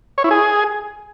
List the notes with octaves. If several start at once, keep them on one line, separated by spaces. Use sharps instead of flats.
C#5
E4
G#4